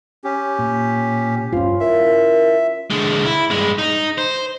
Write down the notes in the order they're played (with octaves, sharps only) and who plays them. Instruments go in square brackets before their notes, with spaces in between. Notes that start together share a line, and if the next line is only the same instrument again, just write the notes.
[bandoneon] C#4 G4
[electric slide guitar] A#2
[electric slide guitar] G2 C5 F5 [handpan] C#4 F4
[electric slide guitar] E4 [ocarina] A#4 [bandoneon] E5
[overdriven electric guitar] D3 G#3
E4
G2 G#3
D#4
C5